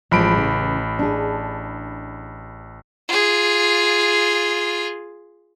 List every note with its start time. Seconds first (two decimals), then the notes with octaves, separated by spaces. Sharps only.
0.11 A1 F3 G#3 B5 D7
0.38 C#3 E3
0.99 D4 G#4
3.08 F4 G#4